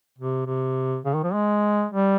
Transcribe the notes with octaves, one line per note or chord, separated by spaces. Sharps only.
C3
C3
C#3
D#3
F3
G#3
G3